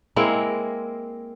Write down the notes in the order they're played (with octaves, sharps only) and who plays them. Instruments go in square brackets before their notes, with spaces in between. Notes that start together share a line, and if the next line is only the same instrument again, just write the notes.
[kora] G#3 A#3 C4 E4